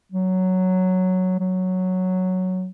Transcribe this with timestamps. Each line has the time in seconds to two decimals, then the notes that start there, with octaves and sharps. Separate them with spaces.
0.12 F#3
1.40 F#3